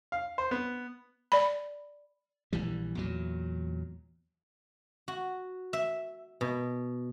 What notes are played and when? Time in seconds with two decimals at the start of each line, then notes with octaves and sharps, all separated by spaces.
0.12 F5
0.38 C5
0.51 B3
1.32 D5 B5
2.53 A#1 E3 G3
2.95 E2 A#2 F#3
5.08 F#4
5.73 E5
6.41 B2